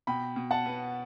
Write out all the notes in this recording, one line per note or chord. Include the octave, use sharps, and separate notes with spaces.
B2 G5 B5
B2
F#5 A5
B3